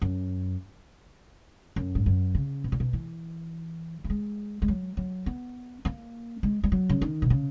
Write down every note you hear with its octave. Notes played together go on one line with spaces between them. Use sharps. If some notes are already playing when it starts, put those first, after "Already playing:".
F#2
F#2
G#2
F#2
C#3
B2
A#2
B2
E3
A#3
G#3
G#3
F#3
F#3
B3
A#3
G#3
G#3
F#3
C#3
D#3
B2
C#3